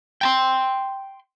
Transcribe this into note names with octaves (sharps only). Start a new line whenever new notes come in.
G5 A5 C6